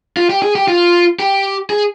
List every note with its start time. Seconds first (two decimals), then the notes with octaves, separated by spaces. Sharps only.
0.17 F4
0.30 G4
0.43 G#4
0.55 G4
0.68 F4
1.19 G4
1.70 G#4